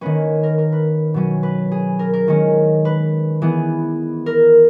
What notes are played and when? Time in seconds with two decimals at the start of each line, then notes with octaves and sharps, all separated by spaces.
0.01 D#3 A#3 C#4 B4
0.43 A#4
0.58 A#4
0.72 B4
1.14 B2 F#3 C#4
1.43 B4
1.72 G#4
1.99 A#4
2.13 A#4
2.28 D#3 G#3 C#4
2.85 B4
3.42 E3 B3 G#4
4.26 A#4